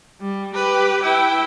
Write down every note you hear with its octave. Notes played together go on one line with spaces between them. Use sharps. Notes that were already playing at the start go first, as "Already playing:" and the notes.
G3
G4 B4
E4 G5